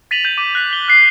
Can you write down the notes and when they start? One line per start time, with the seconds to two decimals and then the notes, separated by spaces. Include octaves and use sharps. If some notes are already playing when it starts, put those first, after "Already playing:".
0.11 A6 B6 D#7 F7 F#7
0.25 G6 D#7
0.38 D6 D#7
0.55 F#6 B6
0.73 G7
0.88 F#6 C7